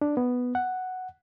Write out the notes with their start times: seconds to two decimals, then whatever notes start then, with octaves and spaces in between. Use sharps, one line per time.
0.02 D4
0.17 B3
0.55 F#5